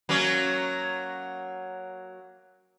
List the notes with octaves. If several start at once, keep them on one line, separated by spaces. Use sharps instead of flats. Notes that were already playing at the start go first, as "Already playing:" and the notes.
F#3 A#3 C#4